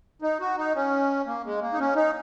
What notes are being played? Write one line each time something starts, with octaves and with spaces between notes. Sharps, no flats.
D#4
F#4
D#4
C#4
A#3
G#3
A#3
D#4
C#4
D#4